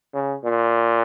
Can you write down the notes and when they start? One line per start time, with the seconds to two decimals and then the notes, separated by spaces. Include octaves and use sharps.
0.14 C#3
0.44 A#2